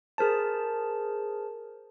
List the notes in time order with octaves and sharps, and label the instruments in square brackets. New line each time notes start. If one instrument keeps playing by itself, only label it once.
[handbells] G#4 A#4 C5 A5